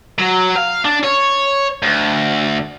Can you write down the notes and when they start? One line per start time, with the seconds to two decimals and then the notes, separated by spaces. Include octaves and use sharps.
0.19 F#3
0.56 F5
0.85 D4
1.04 C#5
1.83 D2